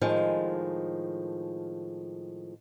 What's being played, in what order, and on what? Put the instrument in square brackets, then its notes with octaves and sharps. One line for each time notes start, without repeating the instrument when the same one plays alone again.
[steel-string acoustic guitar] A2 D#3 F3 G#3